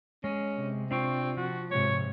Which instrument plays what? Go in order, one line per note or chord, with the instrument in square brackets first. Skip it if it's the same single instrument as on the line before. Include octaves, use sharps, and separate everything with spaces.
[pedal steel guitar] G#3 [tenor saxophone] C#4
[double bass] C3
[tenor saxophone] C4 [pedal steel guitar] D4 F4 C#6
[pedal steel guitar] F3 [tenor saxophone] F#4
[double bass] G#2 C3 [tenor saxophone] C#5